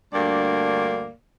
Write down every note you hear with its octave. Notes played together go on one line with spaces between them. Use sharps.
D2 G2 A#3 D5